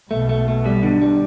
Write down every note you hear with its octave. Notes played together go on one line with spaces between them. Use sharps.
B1 B2 A3
A3
A3
G3
D3
G3